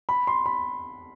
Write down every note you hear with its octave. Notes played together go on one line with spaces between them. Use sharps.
B5
C6
B5